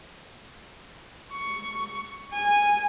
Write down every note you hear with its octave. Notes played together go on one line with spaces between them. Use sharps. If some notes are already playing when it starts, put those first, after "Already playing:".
C#6
G#5